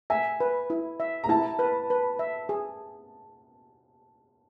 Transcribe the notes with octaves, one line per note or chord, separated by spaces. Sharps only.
E5 G#5
B4
E4
E5
A#5
E4 A5
B4
B4
E5
G#4